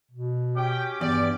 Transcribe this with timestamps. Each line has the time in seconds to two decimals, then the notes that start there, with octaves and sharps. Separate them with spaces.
0.11 B2
0.57 C#4 G4 G5 D6
1.01 E2 G2 D5